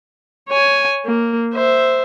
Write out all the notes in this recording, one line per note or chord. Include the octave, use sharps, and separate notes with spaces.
C#5 G#5
A#3
C5 E5